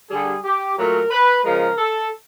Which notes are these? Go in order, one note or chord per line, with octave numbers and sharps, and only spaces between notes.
D3 G3 G#4
G4
A#2 F#3 A3 A#4
B4
C#3 F3 G#3 A#4
A4